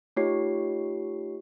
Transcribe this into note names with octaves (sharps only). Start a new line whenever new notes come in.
A3 D#4 F4 G4 C#5 C7